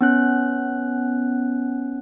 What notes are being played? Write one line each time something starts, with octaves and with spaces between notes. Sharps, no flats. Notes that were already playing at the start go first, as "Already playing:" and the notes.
B3 C#4 F#6